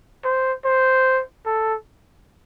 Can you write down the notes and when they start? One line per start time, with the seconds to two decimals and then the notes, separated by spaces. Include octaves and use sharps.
0.24 C5
0.65 C5
1.46 A4